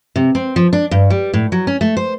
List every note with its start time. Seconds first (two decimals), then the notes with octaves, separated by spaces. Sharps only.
0.16 C3
0.35 C4
0.56 F3
0.73 D4
0.91 G2
1.10 G3
1.34 A2
1.52 F#3
1.67 C#4
1.81 A3
1.97 C5